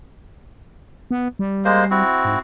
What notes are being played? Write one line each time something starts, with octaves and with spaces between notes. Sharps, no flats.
B3
G3
G#3 A#3 C5
C4 E4 F#4
G#2